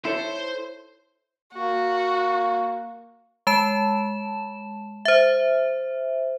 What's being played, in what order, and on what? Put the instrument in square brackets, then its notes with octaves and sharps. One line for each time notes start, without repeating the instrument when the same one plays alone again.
[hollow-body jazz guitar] E4 A4 C#5 [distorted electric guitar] C5
[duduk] A#3 [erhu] F#4
[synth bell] G#3 A5 E7
C5 E5